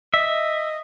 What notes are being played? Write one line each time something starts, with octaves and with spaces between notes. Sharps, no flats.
D#5 E5